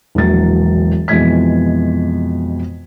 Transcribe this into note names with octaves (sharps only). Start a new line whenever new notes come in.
E1 A#1 E3 F#3 A6
F2 B2 E3 G#3 G#6 B6